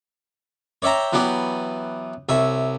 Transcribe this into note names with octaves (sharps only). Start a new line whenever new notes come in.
C#5 D5 E5 G5 A#5
E3 F#3 B3 G4 D5
C2 C#5 E5